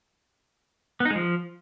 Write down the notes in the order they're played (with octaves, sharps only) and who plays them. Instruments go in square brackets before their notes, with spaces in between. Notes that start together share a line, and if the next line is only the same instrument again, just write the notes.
[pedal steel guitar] B3
D#4
G#3
F3